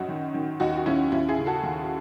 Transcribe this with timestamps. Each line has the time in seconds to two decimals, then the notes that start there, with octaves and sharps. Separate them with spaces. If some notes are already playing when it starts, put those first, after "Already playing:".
Already playing: F#2 D#4 F#4
0.08 D#3
0.34 D#3
0.60 D#2 D#4 F#4
0.77 F#4
0.86 D#2 C#4 E4
1.12 D#2 C#4 E4
1.29 E4 G#4
1.38 C#3
1.46 F#4 A4
1.63 D#2